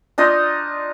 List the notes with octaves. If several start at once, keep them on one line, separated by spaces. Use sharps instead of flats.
D4 D#4 F4 D#5